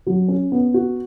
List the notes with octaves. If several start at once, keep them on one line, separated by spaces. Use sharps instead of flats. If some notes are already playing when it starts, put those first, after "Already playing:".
F#3
C#4
B3
F#4